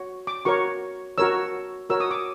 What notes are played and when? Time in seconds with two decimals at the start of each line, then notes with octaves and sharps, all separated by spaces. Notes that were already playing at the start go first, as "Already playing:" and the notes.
Already playing: F#4 C#5
0.27 D6
0.45 F#4 A#4 C#5 C#6
1.18 F#4 A#4 C#5 E6
1.90 F#4 A#4 C#5 E6
2.00 D#6
2.11 D6